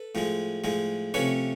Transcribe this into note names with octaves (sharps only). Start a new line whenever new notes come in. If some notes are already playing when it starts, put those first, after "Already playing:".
Already playing: A4 B4
A2 F3 G#3
A2 F3 G#3
C3 F3 A3 C#4 B4 C#5